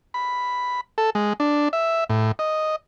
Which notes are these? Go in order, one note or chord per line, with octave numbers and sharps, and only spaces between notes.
B5
A4
G#3
D4
E5
A2
D#5